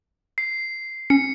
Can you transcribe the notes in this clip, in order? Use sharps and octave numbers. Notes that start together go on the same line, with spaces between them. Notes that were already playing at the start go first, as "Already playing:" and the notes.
C7
C#4 C#7